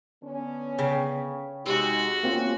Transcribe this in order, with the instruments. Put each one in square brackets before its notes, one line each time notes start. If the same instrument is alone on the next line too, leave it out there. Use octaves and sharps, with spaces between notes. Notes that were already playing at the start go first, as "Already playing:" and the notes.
[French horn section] D3 B3 C#4
[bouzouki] C#3 [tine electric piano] G5 B6
[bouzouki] C3 [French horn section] G#3 D#4 [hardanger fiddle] F#4
[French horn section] G#2 B2 C#4 [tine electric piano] A#3 C4 F4